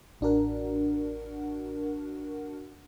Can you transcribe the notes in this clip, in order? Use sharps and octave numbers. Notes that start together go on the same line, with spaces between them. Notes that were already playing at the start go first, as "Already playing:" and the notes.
A1 D4 F#4 A#4 F#5